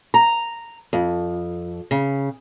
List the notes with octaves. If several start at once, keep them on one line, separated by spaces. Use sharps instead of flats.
A#5
F2
C#3